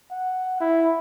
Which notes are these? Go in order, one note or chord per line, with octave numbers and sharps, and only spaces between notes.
F#5
E4